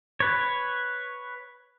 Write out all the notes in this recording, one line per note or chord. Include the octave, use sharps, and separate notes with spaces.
B4 C#5